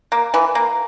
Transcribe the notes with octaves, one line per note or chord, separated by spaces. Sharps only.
A#3
E3
A#3